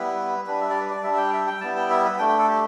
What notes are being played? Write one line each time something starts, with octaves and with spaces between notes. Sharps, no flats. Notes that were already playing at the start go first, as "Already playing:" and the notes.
Already playing: G3 B3 E4 B4
G3 D4 B4
E5
D5
B4
D5
G3 D4 E5
E5
G5
E5
G5
G3 B3 E4 A5
G5
E5
B4
A3 D4 G5
G5
A4
G4